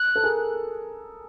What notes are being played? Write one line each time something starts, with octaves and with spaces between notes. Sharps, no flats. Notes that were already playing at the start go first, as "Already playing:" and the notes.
Already playing: F#6
A4
G#4 A#4